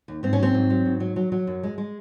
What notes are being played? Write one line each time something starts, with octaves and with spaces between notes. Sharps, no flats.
D#2
G#2 C4
C#4
F#3 C4
G#2
F#3
G#2
F#3
F#3
F#3
F#2
G#3
G#3